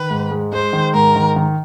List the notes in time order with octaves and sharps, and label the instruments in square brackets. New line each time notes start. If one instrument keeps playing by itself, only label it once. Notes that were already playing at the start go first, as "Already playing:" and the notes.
Already playing: [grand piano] D#3 [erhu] B4
[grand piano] G#2
G#3
[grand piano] G#3 [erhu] C5
[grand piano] D#3
[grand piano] G#2 [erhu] A#4
[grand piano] D#3
D#3